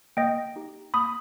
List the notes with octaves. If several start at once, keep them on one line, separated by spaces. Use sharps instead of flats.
A#3 D#5 G5
D#4 G4
A#3 B5 D#6